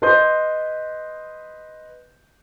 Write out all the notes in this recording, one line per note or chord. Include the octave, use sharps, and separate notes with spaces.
B4 D#5 C6 G6